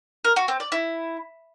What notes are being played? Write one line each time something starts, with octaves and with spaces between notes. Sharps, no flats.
A#4
F#4
C4
D5
E4